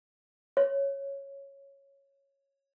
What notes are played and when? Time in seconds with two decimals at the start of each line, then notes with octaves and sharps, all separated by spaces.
0.57 C#5